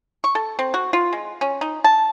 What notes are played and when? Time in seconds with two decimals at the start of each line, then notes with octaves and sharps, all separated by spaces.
0.24 C#6
0.35 A4
0.59 C4
0.74 F#4
0.93 F4
1.13 G#3
1.41 C#4
1.61 D#4
1.84 A5